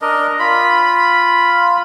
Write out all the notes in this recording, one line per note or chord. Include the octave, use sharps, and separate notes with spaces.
D4 A#4 D#5
F4 B5